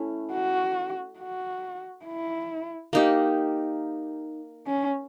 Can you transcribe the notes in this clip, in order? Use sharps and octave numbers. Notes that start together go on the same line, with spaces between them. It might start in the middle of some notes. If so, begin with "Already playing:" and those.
Already playing: A3 C#4 E4
F#4
F#4
E4
A#3 D#4 G4
C#4